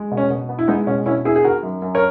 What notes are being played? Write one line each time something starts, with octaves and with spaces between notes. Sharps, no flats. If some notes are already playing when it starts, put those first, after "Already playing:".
Already playing: G#3
B2
C#4
B2
B3
E4
G#3 B3 D#4
B2 C#4
B2 C#4 E4
B3 E4 G#4
G#4
D#3 F#4 A#4
F#2
F#2
A#4 C#5